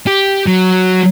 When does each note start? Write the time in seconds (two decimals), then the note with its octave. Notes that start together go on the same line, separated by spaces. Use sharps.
0.07 G4
0.47 F#3